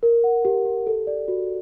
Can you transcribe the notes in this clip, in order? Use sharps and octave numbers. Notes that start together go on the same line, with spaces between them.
A#4
F#5
G4
G4
A4
D5
F#4